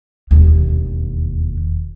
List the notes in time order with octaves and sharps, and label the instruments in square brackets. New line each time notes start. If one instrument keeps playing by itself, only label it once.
[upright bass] E1 D#2